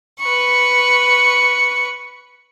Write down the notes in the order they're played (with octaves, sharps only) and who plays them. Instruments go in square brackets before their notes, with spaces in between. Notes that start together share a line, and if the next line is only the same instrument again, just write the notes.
[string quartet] B4 C#6